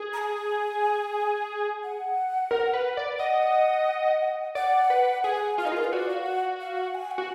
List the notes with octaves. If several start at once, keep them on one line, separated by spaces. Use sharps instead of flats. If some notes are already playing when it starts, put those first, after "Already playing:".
Already playing: G#4
A#5
G#5
F#5
A#4
B4
D5
D#5 F#5
D5 F#5
B4
G#4 G#5
F4 F5
D#4 G#4
F4 A#4
B4
F#4 D5
F5
F#5
F5
F#5
G#5
F#5
F#4